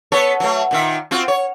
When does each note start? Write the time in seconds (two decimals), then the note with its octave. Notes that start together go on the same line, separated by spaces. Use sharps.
0.12 B3 A4 C#5
0.40 F#3 A3
0.71 A#2 D#3 E5
1.11 C4 F4 F#4
1.28 C#5